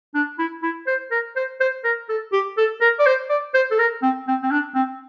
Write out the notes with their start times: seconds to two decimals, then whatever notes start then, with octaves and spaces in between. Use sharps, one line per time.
0.15 D4
0.39 E4
0.63 E4
0.87 C5
1.11 A#4
1.36 C5
1.60 C5
1.84 A#4
2.09 A4
2.32 G4
2.58 A4
2.81 A#4
2.99 D5
3.06 C5
3.29 D5
3.54 C5
3.71 A4
3.79 A#4
4.02 C4
4.28 C4
4.43 C4
4.51 D4
4.75 C4